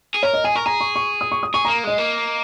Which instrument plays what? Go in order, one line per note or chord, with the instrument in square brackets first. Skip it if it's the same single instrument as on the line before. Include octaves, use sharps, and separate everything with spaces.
[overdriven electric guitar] G#4
[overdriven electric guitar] A#4 [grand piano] C#5
[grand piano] D#5
[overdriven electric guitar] G#4 [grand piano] G#5
[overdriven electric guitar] A#4 [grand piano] C#6
[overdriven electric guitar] G#4 [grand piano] A#5
[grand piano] C#6
C#6
D#6
C#6
D#6
[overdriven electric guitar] G#4 [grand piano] C#6
[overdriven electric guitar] A#3 [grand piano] A#5
[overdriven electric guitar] G#3 [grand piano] D#5
[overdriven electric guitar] A#3